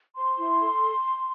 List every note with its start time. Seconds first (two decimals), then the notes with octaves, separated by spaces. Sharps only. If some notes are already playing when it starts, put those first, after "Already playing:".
0.16 C5 C6
0.38 E4
0.61 A4